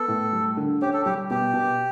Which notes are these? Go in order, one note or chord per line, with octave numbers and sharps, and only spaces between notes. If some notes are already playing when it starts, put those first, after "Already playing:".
Already playing: B3 A4
A2
G3
D3
C#4 G4
A4
G3 G4
B2 G4
B2